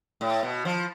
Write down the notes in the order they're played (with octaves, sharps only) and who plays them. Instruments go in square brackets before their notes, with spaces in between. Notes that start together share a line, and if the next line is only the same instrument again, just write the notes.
[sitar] A2
B2
F3